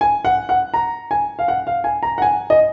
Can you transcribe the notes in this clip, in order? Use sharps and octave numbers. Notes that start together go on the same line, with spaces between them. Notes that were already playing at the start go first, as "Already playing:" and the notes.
G#5
F#5
F#5
A#5
G#5
F5
F#5
F5
G#5
A#5
F#5
G#5
D#5